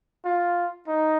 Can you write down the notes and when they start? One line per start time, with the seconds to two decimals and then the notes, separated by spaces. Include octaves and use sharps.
0.25 F4
0.88 D#4